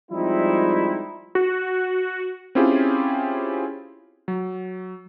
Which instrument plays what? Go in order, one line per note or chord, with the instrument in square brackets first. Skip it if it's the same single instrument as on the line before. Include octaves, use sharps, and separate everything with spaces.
[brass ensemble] F3 G3 G#3 C4 D#4 E4
[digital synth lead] F#4
[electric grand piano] C4 C#4 E4 F4 G4 G#4
F#3